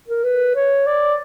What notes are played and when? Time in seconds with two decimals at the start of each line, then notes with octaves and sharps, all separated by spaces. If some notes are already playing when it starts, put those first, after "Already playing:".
0.08 A#4
0.24 B4
0.56 C#5
0.87 D5